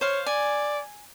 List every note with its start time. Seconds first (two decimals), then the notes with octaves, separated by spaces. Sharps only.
0.01 C5 C#5 F5
0.26 D5 G#5